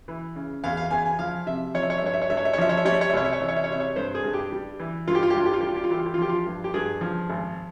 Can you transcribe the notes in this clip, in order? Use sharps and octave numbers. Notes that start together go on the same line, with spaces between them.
E3
C#3
E2 F5
F5
E2 G#5
G#5
F3 F5
C3 E5
F3 C#5
E5
C#5
E5
G2 C#5
E5
C#5
G2 E5
C#5
E5
C#5
F3 E5
C#5
E5
G3 C#5
E5
C#5
E5
C2 C#5
E5
C#5
E3 E5
C#5
E5
C#5
C3 E5
C#5
G2 C5
G#4
G2
G4
G3
E3
G2 F4
G4
F4
G4
G2 F4
G4
F4
G3 G4
F4
G4
F4
E3 G4
F4
G4
F4
F3 G4
F4
G2
G4
G2 G#4
F3
G#1